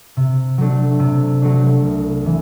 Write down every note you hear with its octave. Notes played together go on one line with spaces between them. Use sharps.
C3
F#3 A3 D4
C3
F#3 A3 D4
C2
C3 E3